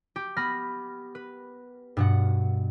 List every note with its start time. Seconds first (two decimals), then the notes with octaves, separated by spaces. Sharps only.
0.16 G4
0.37 B3 B5 F6 A#6
1.15 B4
1.97 G2 B2 F#5